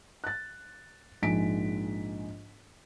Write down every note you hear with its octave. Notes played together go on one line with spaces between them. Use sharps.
F#6 A6
A#1 G#2 G#5 B6 D7